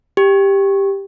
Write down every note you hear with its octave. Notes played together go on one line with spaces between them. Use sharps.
G4